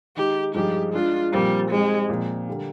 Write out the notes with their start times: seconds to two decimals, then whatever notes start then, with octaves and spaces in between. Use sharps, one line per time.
0.17 D#3 G#3 D#4 G4
0.55 G2 F3 G#3 D#4 G4 G#4
0.93 G#3 D4 F4 G#4
1.32 A#2 F3 G3 C4 F4 A#4
1.71 G3 G#3 C4 D#4
2.09 A#2 F3 C4
2.48 D3 G3 A#3